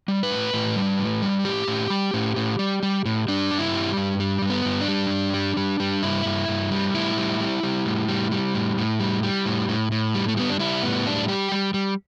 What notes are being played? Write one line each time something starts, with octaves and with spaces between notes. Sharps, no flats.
G3
B4
A2
A2
G3
A2
G3
A2 G4
A2
G3
A2
A2
G3
G3
A2
G3 D4
G2
E4
G3
G2
G3
G2
B3
G2
D4
G3
G2
G3
G3
G3
G2 E4
G2
G2
G3
A2 E4
G3
G3
G3
A2
G3
G3
A2
A2
G3
G3
A2
A2
A2
G3
A3
G3 B3
D4
G3 E4
A2 B3
G3 D4
G3 G4
G3
G3